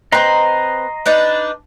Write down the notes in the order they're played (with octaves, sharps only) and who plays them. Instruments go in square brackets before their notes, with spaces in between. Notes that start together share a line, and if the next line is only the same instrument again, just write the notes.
[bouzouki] C4 B4 [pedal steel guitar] D#5 A#5 C6
[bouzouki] D4 D#4 B4